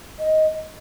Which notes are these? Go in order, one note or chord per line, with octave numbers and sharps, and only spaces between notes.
D#5